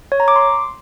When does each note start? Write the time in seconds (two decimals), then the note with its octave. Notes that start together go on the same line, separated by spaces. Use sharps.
0.12 C#5
0.20 A#5
0.28 D6
0.36 C6